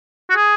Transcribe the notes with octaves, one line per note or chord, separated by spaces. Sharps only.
F#4
G#4